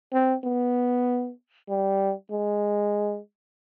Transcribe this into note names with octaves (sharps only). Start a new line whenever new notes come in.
C4
B3
G3
G#3